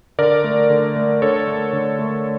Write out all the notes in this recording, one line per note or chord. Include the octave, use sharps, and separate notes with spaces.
D3 A#4 D5
A3
D3
A3
D3 A4 C#5
A3
D3
A3